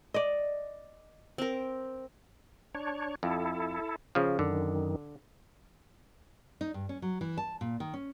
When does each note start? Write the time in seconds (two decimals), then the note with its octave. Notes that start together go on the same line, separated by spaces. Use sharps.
0.14 D5 D#5
1.38 C4 A#4
2.75 D4 C#5
3.23 F2 E4 A4
4.15 C#3 F3
4.39 F#2 D3 D#3
6.61 D#4
6.74 G2
6.89 C#4
7.02 F#3
7.21 E3
7.38 A5
7.61 A#2
7.80 D#3
7.94 C#4